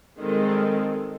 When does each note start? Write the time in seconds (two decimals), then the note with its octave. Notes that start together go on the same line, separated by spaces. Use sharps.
0.20 D#3 G3 G#3 C4 A4 D#5